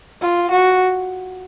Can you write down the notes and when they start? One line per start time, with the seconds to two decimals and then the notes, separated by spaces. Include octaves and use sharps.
0.22 F4
0.51 F#4